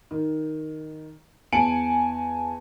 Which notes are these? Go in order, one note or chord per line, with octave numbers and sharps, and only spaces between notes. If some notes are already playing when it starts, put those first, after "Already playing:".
D#3
E2 G#5 A5 C#7 D7 F#7